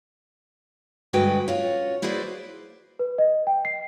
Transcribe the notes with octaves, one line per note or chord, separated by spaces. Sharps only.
G2 D3 G#3 F#4 B4 G5
C#4 F4 F#4
E4 F#4 G#4 B4 C5 D5
B4
D#5
G5
C7